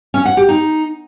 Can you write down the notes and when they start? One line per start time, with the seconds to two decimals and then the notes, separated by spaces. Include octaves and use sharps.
0.14 C#4
0.25 F#5
0.37 G4
0.49 D#4